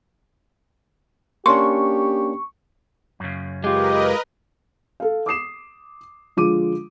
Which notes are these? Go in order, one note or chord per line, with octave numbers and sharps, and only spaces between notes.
A#3 C#4 D4 G4 C6 C#6
F#2 C#3
G#3 F4 G4 A#4 B4 D#5
A4 F5
D6 D#6 C7 E7
D3 F3 G#3 F4 D6 D#7